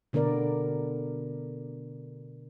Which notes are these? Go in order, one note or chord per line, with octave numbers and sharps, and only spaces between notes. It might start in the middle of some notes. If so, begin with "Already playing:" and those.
B2 D3 B3 A#4 D5